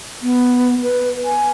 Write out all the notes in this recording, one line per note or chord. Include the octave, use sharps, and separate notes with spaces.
B3
B4
G#5